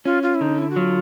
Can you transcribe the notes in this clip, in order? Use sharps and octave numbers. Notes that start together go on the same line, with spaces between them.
C#4 F4
F4
E4
D3 D#4
E4
F#4
F#3 F4